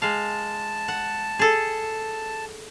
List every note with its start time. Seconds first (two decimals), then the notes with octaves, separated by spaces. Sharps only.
0.02 G#3 F5 A5
0.88 F#5
1.39 G#4 A4